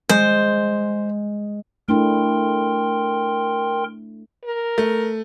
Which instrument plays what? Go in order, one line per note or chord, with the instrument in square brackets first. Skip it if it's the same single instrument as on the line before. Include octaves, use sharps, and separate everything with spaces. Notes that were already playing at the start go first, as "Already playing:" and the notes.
[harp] G#3 [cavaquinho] C5
[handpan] A3 D4 E4 [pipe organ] A#4 G5 C6
[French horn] A#4
[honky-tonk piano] A3